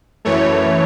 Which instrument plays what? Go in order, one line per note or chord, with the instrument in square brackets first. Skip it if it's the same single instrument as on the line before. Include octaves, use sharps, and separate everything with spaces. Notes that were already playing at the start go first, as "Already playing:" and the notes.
[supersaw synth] F#2 E3 A3 C#5